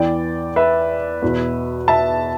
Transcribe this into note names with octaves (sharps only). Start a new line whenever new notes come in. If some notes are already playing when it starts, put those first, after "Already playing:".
Already playing: E2 E3 D5 G5
B4 E5
E2 B2
E5 A5